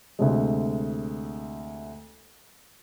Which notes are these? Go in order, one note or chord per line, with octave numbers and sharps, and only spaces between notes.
D2 C3 G#3